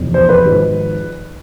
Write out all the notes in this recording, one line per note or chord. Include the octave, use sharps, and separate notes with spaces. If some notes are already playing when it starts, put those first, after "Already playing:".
Already playing: F1 E2 B2
C5
B4
G#1 G#2 F3